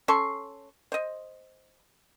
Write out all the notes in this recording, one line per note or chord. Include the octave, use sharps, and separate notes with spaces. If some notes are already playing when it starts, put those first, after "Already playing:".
C#4 A4 C6 C#6
C5 D#5